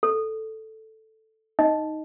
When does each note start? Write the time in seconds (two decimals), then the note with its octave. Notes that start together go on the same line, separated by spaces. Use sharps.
0.03 A4
1.59 D#4 D#5